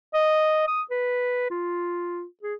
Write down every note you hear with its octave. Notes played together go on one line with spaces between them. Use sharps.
D#5
D#6
B4
F4
G#4